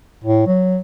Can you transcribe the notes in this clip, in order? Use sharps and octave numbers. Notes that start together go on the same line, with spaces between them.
A2
F#3